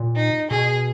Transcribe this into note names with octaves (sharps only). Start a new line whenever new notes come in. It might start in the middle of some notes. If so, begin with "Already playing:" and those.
Already playing: A#2
D#4
B2 G#4